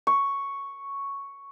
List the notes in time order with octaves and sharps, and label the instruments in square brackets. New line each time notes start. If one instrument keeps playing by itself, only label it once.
[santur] C#6